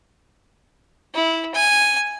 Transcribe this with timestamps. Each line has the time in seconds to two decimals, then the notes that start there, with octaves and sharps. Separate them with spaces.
1.14 E4
1.54 G#5